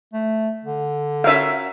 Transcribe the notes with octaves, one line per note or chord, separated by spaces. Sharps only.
A3
D3
C#4 F#4 A#4 E5 F5